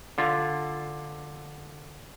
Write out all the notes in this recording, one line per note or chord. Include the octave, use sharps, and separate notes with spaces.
D3 F4